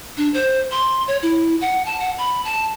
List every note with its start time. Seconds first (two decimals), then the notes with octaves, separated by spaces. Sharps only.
0.17 D4
0.34 C5
0.71 C6
1.07 C#5
1.23 E4
1.61 F#5
1.86 A5
2.00 F#5
2.18 B5
2.45 A5